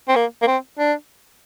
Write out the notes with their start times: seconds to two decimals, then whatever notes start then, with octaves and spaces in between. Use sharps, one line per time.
0.08 C4
0.16 A#3
0.42 A#3
0.47 C4
0.78 D4